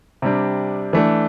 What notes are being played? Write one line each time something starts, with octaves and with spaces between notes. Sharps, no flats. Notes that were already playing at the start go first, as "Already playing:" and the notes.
C3 G3 D4
E3 A3 D4